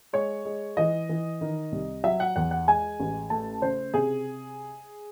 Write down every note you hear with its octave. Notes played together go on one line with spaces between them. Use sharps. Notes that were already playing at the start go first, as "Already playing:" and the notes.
G#3 C#5
G#3
E3 D#5
E3
D#3
C2
F#3 E5
F#5
E2 F#5
F#5
G#3 G#5
A1
A3 A5
C#3 C5
C3 G#4